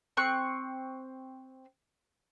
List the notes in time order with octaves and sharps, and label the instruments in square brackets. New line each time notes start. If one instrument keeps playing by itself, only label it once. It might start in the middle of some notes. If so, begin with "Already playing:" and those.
[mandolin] C4 C#6 F#6